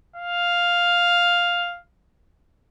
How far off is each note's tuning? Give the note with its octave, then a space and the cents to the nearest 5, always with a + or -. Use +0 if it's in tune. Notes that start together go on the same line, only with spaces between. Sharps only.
F5 +5